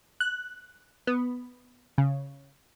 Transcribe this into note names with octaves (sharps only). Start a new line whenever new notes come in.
F#6
B3
C#3